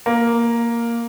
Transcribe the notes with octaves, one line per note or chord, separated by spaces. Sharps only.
A#3